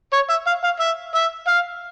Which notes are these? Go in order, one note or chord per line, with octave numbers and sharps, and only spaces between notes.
C#5
E5
F5
F5
E5
E5
F5